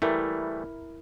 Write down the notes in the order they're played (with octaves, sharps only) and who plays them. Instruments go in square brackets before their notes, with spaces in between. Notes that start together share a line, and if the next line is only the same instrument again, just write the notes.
[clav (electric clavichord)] E3 G3 A3 [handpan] E4 A#4